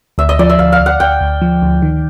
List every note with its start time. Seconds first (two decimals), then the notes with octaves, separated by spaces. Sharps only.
0.18 D2 E5
0.29 D#5
0.39 F3 D5
0.50 E5
0.59 D2 F5
0.72 F5
0.80 D2
0.86 F#5
1.00 D2 G5
1.21 D2
1.42 F3
1.62 D2
1.82 D#3